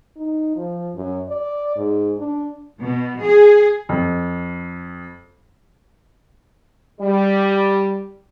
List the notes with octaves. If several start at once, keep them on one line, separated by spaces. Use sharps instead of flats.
D#4
F3
F#2
D5
G#2
D4
B2
G#4
F2
G3